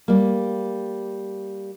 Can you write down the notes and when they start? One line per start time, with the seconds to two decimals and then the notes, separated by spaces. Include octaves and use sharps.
0.08 G3 A#3